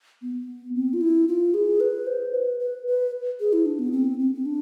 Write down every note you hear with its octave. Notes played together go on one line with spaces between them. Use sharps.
B3
C4
F4
E4
F4
G#4
B4
C5
B4
B4
B4
G#4
E4
D4
B3
C4
C4
C4
D4